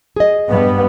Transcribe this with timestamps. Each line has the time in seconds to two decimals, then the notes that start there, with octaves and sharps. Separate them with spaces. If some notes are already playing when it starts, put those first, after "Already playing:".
0.16 G#4 D#5
0.48 G2 B3